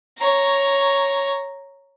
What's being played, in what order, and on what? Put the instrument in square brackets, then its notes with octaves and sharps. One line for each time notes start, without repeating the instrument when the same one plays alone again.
[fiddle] C#5 A#5